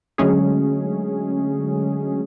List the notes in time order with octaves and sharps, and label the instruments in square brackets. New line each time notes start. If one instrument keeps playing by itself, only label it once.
[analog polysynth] D3 F#3 G#3 A3 C#4 G#4